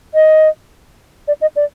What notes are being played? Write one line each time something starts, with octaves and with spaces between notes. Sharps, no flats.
D#5
D5
D#5
D5